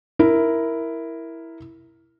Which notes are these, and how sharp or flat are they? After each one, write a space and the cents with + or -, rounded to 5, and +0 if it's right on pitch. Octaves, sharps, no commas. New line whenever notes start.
E4 +0 A#4 +0